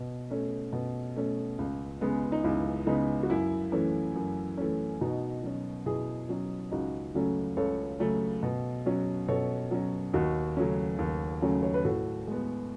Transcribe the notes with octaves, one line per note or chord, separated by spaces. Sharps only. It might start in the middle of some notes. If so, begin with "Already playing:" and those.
Already playing: B2
A3 C#4
B2
A3 C#4
C#2
C#3 G#3 B3
D#4
C#2 E4
C#3 G#3 B3 D#4
F#4
F#2 E4
E3 A3 C#4
F#2
E3 A3 C#4
B2 D#4 F#4
F#3 C#4
B2 E4 G#4
F#3 C#4
C#2 D#4 F#4
C#3 F#3 A3 C#4
C#2 A4 C#5
C#3 F#3 A3 C#4
B2
F#3 C#4
B2 A4 C#5
F#3 C#4
D#2 D#4 F#4
C#3 F#3 A3 C#4
D#2
C#3 F#3 A3 C#4
C#5
B4
A2 F#4 A4
G#3 B3